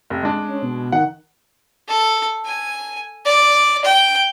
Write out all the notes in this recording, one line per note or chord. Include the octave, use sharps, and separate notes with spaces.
F1
G#3 D4
C#4
B2
D#3 F#5
A4
G#5
D5
G5